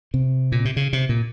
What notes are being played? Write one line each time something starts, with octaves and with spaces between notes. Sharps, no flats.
C3
A#2
C3
C#3
C3
A#2